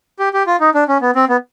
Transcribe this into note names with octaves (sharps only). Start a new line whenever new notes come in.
G4
G4
F4
D#4
D4
C#4
B3
C4
B3